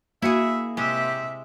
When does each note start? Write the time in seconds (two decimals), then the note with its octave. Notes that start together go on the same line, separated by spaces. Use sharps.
0.22 A#3 E4 F#4 G#4 E5 F#5
0.77 C3 G#3 G4 E5